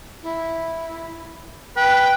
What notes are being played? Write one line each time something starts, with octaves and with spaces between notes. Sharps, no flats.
E4
B4 G5